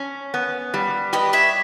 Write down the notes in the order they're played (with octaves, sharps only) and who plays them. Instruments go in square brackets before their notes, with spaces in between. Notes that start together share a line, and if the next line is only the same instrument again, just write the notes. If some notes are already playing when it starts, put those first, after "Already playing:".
Already playing: [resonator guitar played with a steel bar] C#4
B3
G3
[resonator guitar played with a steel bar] G4 [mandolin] B4 D#5
[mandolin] C#5 E5